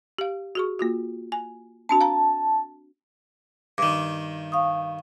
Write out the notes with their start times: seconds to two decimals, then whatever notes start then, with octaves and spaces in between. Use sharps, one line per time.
0.19 G4 F5
0.55 F#4 G#4 C#6
0.79 A#3 F4 F#4
1.32 G#5
1.89 C4 D4 F#4 A5
2.01 F5 A#5
3.78 G2 D#3 D6
4.52 F5 C#6 D#6